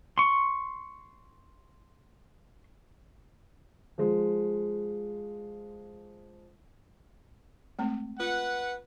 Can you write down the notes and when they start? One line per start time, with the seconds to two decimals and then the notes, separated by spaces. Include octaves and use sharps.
0.18 C6 C#6
3.98 F3 G#3
7.79 G#3 A3 C4
8.20 F4 B4 F#5